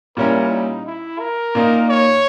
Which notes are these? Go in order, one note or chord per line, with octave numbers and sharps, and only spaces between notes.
A#2 G3 C#4 E4 A#4
D#4
E4
A#4
A#2 A#3 D#4
C#5